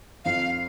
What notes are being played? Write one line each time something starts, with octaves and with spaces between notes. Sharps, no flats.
F2 F5